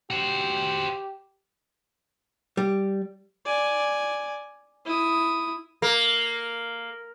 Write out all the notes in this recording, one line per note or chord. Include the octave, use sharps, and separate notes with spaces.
F#4 G4 C5
G3
D5 G#5
E4 D#6
A#3